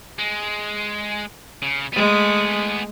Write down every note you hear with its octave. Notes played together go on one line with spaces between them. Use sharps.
G#3
C#3
G#3 A3 B3 G#4